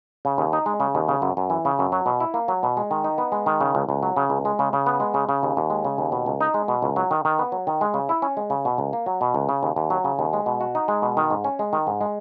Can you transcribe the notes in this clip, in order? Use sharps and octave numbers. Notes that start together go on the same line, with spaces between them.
C#3
D#2
D#4
G#3
C#3
D#2
C#3
F#2
F#2
E3
C#3
F#2
F#3
B2
E4
A#3
F#3
B2
G#3
D#3
D#4
B3
G#3
D#3
C#3
C#2
C#2
F#3
C#3
C#2
G#3
C#3
C#3
B3
G#3
C#3
C#3
D#2
D#2
G#3
C#3
D#2
B2
C#2
D#4
G#3
B2
C#2
F#3
D#3
D#3
B3
F#3
D#3
G#3
C#3
E4
C#4
G#3
C#3
B2
C#2
A#3
F#3
B2
C#2
C#3
D#2
D#2
F#3
C#3
D#2
G#3
B2
F#4
D#4
G#3
B2
D#3
G#2
C#4
G#3
D#3
G#2
G#3